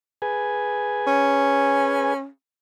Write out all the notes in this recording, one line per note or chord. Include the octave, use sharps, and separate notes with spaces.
G#4 B4 G#5
C#4